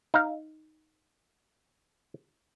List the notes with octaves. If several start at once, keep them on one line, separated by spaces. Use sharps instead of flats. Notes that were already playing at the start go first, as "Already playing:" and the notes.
D#4 F5